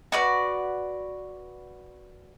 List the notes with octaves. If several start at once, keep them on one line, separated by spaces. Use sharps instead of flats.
F#4 B4 D5